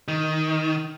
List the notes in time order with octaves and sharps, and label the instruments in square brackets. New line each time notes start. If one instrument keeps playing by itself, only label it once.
[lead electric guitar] D#3